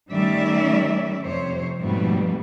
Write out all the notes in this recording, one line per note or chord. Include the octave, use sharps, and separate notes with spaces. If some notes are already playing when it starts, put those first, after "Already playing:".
D#3 G3 A3 C#4 D5 E5
F2 C3 C5 C#5
F2 G#2 B2 G3 A3 B3